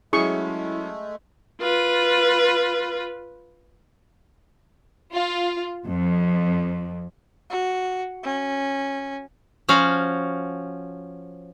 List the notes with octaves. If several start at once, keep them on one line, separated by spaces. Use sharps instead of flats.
F#3 G#3 A3 C#4 E4 G#4 C#6
F4 B4
F4
F2
F#4
C#4
F3 C#4 F#4 F5